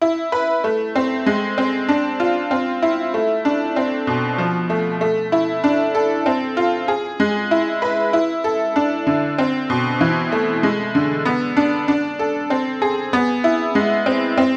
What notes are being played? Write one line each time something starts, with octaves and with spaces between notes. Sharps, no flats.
E4
B4
A3
C4
G#3
C4
D4
F4
C4
E4
A3
D4
C4
B2
F3
A3
A3
E4
D4
A4
C4
F4
G#4
G#3
E4
B4
E4
A4
D4
D3
C4
B2
E3
A3
G#3
D3
B3
D4
D4
A4
C4
G#4
B3
E4
G#3
C4
C4